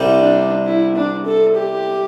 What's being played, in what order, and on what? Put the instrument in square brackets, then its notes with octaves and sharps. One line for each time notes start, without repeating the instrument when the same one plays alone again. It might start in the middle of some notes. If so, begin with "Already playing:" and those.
Already playing: [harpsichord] C2 C3 G3
[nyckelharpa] D4
E4
D4
A4
G4